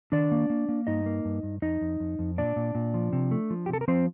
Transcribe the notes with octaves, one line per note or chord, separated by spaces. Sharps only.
D#3 D4 D5
A#3
A#3
A#3
G2 D#4 D#5
A#3
G2
G2
F2 D#4 D#5
F2
F2
F2
A#2 D4 D5
A#2
A#2
F3
C3
A3
F3
G4
C3 A4
A#4
F3 C4 C5